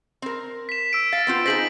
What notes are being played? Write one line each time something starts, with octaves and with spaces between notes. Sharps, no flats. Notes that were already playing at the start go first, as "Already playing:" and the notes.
C4 A#4
B6 E7
E6 D7
F5 A6
B3 C4 F4
D#4 G#4 C5 A#6 B6 F#7